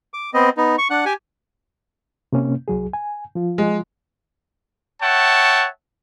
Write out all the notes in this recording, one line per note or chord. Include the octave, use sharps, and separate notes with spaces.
D6
B3 C4 D#5
B3 D#4
C#6
D4 F#5
G4 G#5
C3 A#3 C#4
C2 F#3 G#4
G#5
F3 F4
G#3
C#5 E5 F#5 G5 A5 C#6